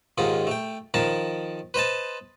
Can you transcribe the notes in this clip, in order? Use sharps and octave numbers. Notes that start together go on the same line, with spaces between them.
D#2 G#2 D#3 F4
A3 G5
D#3 F3 A#4 A5 A#5
B4 C5 D#5 A5